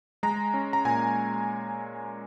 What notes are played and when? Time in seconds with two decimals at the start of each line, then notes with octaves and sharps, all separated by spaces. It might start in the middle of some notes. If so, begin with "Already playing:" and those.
0.23 G#3 A#5
0.54 C#4
0.73 A#5
0.85 A#2 G#5